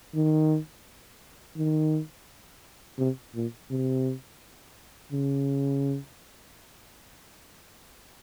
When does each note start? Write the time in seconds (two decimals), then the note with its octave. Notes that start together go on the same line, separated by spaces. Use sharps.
0.15 D#3
1.57 D#3
2.98 C3
3.35 A#2
3.70 C3
5.12 C#3